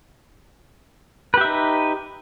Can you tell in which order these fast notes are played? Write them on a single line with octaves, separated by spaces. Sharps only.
B4 G4 E5 D#4